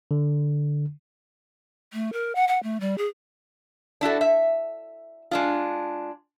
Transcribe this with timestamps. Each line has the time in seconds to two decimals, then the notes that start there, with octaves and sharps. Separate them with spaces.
0.11 D3
1.93 A3
2.13 A#4
2.35 F#5
2.48 F#5
2.63 A3
2.80 G3
2.98 G#4
4.01 D4 E4 F#4 A4
4.21 E5
5.31 G#3 D4 F4